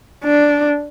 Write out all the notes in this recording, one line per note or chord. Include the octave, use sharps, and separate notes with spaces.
D4